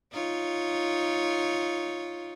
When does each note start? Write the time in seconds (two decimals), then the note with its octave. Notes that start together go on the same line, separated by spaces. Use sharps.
0.12 D#4 F4 C#5